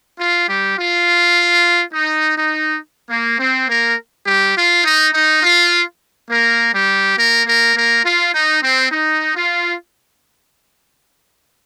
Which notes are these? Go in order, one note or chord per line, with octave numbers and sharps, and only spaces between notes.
F4
G3 G4
F4
D#4
D#4
A#3
C4
A#3 A#4
G3 G4
F4
D#4
D#4
F4
A#3 A#4
G3 G4
A#3 A#4
A#3 A#4
A#3 A#4
F4
D#4
C4
D#4
F4